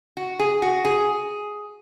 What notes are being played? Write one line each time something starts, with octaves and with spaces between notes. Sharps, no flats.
F#4
G#4
F#4
G#4